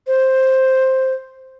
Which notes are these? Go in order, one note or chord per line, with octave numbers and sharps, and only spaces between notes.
C5